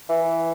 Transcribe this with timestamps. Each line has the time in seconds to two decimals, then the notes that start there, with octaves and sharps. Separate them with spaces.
0.09 E3